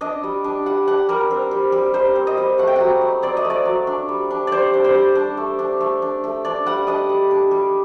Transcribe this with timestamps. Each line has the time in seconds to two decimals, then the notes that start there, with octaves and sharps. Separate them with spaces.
0.01 D4 D#5
0.23 G3
0.44 D4
0.66 G3 F#5
0.88 D4 F#5
1.09 G3 A#4
1.30 C4
1.51 G3
1.72 G3
1.94 D#4 C5
2.15 C4
2.27 D#5
2.37 G3
2.58 A3 F#5
2.67 G5
2.76 F#3 F#5
3.01 D#4
3.22 C4 D5
3.37 D#5
3.45 A3
3.50 D5
3.65 F#3
3.87 D4
4.09 G3
4.31 D4
4.47 G3 C5 D5
4.74 D4
4.84 C5
4.95 G3
5.15 D4
5.37 A3
5.59 D4
5.81 A3
6.02 D4
6.24 A3
6.45 D4 D5
6.66 G3 F#5
6.87 D4 D#5
7.09 G3
7.31 D4
7.51 G3